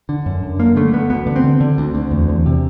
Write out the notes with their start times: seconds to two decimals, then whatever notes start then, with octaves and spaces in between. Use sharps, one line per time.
0.09 D3
0.26 F#2
0.43 F#2
0.59 D3 A#3
0.76 D3 A3
0.93 D3 B3
1.10 D2 B3
1.27 D3
1.36 C4
1.44 D3
1.61 D3
1.78 D2
1.95 D2
2.11 E2
2.29 E2
2.46 C3